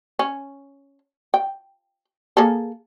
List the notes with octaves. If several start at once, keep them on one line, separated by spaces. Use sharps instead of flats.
C#4
G5
A#3 G#4 A4